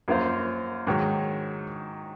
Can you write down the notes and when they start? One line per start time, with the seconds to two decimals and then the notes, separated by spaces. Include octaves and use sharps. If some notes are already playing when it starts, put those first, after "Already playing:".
0.08 F#2 F3 A#3 F4 C5
0.87 G#2 D#3 F#3